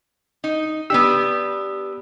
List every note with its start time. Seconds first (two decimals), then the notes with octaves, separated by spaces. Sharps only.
0.44 D#4
0.90 B3 D4 G4 E6